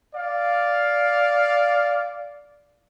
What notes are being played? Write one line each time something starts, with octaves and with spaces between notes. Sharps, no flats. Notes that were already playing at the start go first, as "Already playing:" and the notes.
D5 F5